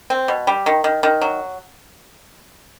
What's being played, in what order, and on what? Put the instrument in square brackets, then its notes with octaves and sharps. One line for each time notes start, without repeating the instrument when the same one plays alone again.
[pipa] C4
B2
G3
D#3
D#3
D#3
F#3